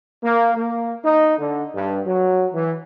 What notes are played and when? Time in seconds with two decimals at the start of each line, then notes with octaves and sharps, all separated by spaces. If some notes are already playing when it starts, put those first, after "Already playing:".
0.24 A#3
0.55 A#3
1.03 D#4
1.39 D3
1.74 G2
2.06 F#3
2.54 E3